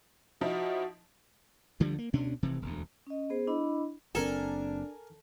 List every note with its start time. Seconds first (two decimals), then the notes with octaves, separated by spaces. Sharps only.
0.41 F3 D#4 E4 F#4
1.80 D2 D3 F3 G3
1.99 A#3
2.13 D2 B2 C#4 D4
2.43 F1 C3 E3
2.62 E1 D2
3.07 C#4 D#5
3.30 B3 G#4 C5
3.47 D4 E4 D#5 B5
4.15 F#1 C4 D4 A4 A#4 G#5